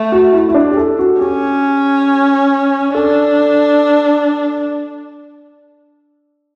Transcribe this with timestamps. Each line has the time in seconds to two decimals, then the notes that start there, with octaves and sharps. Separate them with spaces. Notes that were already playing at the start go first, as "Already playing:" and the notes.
Already playing: A3
0.12 F#4
0.33 E4
0.49 E4
0.54 D4
0.71 G4
0.77 A4
0.99 F#4
1.20 C#4 G4
2.94 D4 A4